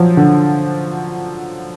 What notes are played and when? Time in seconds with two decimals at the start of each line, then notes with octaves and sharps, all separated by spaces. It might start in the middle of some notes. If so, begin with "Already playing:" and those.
Already playing: F3 F#3
0.17 D3